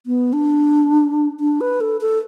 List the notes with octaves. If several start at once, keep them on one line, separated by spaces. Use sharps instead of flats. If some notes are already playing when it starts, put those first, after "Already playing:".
B3
D4
D4
B4
A4
A4